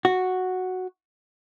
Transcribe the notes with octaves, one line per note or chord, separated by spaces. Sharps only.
F#4